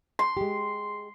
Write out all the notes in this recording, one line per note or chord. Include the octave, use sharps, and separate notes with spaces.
C6
G#3 G4